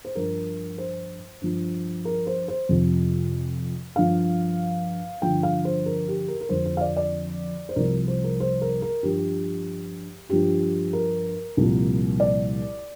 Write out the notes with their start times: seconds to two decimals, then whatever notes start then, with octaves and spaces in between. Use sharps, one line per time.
0.05 C5
0.15 G2 F3 A#4
0.78 C5
1.41 G2 F3
2.05 A#4
2.27 C5
2.48 C5
2.69 F2 C3 F3
3.96 G2 F3 F5
5.22 G2 D3 F3 G5
5.43 F5
5.65 C5
5.86 A#4
6.08 G4
6.28 A#4
6.41 A#4
6.49 F2 D3 F3 C5
6.65 C5
6.77 F5
6.81 D5
6.97 D5
7.69 C5
7.76 C2 C3 F3 A#4
8.08 C5
8.24 A#4
8.40 C5
8.62 A#4
8.82 A#4
9.03 G2 F3 G4
10.29 G2 F3 G4
10.93 A#4
11.57 C2 A#2 F3
12.20 D5